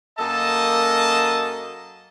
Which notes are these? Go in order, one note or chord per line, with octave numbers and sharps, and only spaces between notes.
F#2 A#3 A4 D#5 A5